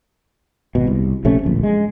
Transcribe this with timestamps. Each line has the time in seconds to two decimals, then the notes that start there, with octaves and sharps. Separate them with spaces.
0.75 G#1 B2
0.87 C2
1.25 A#1 C3 A3 C#4
1.43 D1 A#1
1.63 G#3